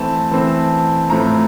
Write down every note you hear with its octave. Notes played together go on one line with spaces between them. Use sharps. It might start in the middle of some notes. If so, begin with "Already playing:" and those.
Already playing: E3 A3 C4 A5
E3 A3 C4
A2 F3 A3 C4 A#5